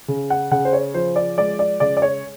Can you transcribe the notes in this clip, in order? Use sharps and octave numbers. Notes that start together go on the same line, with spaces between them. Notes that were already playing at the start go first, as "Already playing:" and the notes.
C#3
F#5
C#3 F#5
C5
C#5
F3 C5
D5
G#3 D5
D5
C#3 D5
D5
C#5